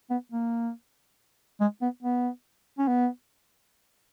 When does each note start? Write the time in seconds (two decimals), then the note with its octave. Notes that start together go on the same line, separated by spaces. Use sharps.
0.10 B3
0.32 A#3
1.60 G#3
1.81 B3
2.03 B3
2.78 C#4
2.87 B3